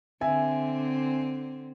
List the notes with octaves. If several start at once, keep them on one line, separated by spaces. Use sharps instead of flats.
D3 C4 E5 G#5